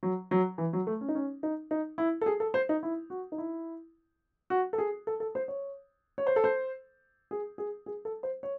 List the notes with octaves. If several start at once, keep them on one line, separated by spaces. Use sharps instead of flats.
F#3
F#3
E3
F#3
A3
C#4
D#4
C#4
D#4
D#4
E4
A4
G#4
A4
C5
D#4
E4
F#4
D#4
E4
F#4
A4
G#4
A4
A4
C5
C#5
C#5
C5
A4
C5
G#4
G#4
G#4
A4
C5
C#5